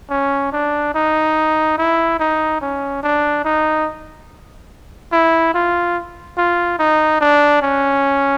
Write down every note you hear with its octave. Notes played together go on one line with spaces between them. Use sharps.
C#4
D4
D#4
E4
D#4
C#4
D4
D#4
E4
F4
F4
D#4
D4
C#4